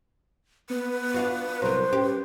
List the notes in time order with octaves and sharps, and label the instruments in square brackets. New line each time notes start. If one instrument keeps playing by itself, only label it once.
[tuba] B3 [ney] B4
[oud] D4 F4 F#4
[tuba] C2 [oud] F#3 A#4 [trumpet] C5
[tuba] C#4 [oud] G4